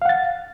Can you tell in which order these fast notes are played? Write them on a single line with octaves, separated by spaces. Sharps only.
F5 F#5 A6